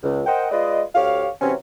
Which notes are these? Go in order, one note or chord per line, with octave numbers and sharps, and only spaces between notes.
C#2
A#4 C5 D#5 F#5 G5
G#3 F4 B4 D5 D#5
D2 G4 C#5 F5
C3 E3 F#3 C4 C#4